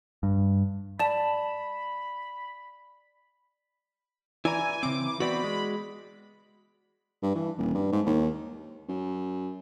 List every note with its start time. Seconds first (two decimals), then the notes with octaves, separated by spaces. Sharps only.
0.23 G2
0.99 D5 A5 B5 E7
4.45 E3 E4 D5 G#5 A#5
4.83 C#3 C4 D6
5.20 E3 B3 C4 F#4 D5 B5
5.44 G#3
7.23 G2
7.35 E3
7.58 D#1
7.74 G2
7.92 G#2
8.06 D#2
8.88 F#2